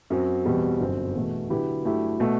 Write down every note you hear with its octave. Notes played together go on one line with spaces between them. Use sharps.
F#2 F#3 C4
E2 B2 G3 C4
G1 F#2 F#3 C4
E2 B2 A3
D3 F#3 B3 E4 G4
G2 F#3 A3 E4 G4
B2 A3